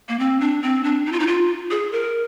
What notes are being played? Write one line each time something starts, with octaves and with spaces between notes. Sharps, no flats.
A#3
C4
D4
C4
D4
D#4
F4
D#4
F4
G#4
A#4